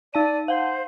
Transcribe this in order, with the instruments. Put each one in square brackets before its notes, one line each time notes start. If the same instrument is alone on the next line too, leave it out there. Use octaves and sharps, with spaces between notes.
[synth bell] D#4 A5 D#7 [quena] D5
[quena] C5 [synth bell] F5 F#5